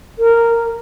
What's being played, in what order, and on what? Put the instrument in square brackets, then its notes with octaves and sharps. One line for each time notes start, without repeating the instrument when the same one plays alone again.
[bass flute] A#4